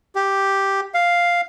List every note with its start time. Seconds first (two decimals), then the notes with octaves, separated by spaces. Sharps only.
0.15 G4
0.94 F5